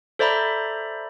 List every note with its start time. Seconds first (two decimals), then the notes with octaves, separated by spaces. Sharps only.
0.19 A4 C5 D5 E5 A#5 B5